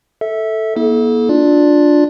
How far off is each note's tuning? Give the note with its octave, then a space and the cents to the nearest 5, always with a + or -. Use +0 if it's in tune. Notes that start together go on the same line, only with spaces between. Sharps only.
A4 +0 E5 -20
A#3 +45 E4 -40 A4 -35
D4 +0 F4 +15 D5 +0